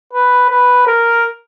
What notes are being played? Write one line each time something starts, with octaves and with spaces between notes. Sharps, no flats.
B4
B4
A#4